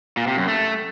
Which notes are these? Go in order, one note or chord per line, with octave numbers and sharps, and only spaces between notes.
A#2
C3
F#2
A3